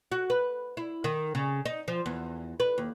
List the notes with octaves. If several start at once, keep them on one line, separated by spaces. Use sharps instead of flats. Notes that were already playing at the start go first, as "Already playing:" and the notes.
F#4
B4
E4
D#3
C#3
D#4
F3
E2
B4
D#2